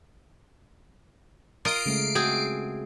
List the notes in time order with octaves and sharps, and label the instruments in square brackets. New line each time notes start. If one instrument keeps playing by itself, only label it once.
[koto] F4 A#4 D#5 [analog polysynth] C7 D7
[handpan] C#3 G#3 A3
[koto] C4 G#4 [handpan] F#4